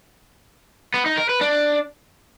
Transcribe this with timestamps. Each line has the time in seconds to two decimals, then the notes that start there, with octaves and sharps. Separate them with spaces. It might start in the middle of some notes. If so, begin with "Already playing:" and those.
0.94 B3
1.06 D#4
1.17 A#4
1.29 B4
1.41 D4